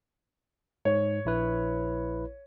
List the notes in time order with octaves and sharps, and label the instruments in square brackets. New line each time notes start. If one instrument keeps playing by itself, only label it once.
[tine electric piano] G#2 [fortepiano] C#5
[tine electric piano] A#1 E4 B4